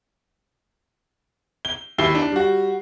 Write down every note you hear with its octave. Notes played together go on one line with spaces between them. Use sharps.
G7
D#2 E4 E5 B5 C7 G7
D4
G3 F#4